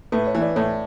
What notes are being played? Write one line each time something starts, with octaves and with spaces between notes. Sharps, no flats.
A2 B4
C#5
E3
D5
A2 C#5